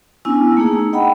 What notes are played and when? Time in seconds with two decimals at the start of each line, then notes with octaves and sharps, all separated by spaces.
0.25 B3 C#4 D4 E4 G#5 E6
0.57 A3 A#3 D#4 G#4
0.93 D#5 F#5 G5 B5